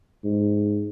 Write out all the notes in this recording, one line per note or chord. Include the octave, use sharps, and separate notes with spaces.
G#2